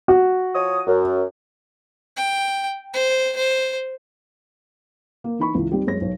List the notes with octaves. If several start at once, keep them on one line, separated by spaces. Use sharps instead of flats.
F#4
F3 C#5 D#6
F#2
G5
C5
C5
A#3
E3 D#4 B5 C#6
C#2 E3
G3 C4 D#4 G4
F#2 G#3 C#5 A#6
B1 C#5